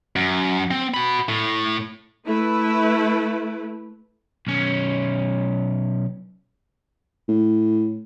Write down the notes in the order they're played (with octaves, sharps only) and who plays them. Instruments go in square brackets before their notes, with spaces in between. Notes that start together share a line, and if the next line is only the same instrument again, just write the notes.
[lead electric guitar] F#2
C4
F#4 B5
A2
[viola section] A3 E4 B4
[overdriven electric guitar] B1 C#4
[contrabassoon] A2